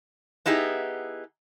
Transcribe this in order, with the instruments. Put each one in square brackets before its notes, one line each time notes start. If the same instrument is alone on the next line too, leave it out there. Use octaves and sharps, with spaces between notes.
[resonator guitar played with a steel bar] B3 D#4 E4 G4 G#4